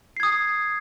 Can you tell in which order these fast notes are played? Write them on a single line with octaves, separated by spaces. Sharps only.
C7 G#6 D#6